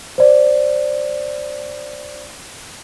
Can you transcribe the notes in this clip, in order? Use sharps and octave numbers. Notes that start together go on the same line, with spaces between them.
C5 D5